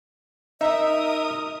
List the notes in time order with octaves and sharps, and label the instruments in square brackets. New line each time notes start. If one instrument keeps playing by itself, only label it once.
[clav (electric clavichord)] D#4 [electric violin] A#4 D#6 [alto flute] D#5 [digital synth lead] E5